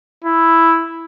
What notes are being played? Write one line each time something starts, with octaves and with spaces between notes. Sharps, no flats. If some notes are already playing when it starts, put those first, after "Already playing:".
E4